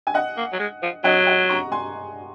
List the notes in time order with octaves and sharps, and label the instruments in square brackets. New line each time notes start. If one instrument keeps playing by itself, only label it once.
[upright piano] G#5
D#5 F#5
[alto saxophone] A#3
F#3
G#3
F3
[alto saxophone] F#3 [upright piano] D#5 F#5
[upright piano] D#5 F#5
A#5 C#6
G#5 C6